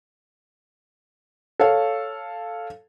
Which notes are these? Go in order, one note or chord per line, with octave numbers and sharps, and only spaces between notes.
A4 C#5 F5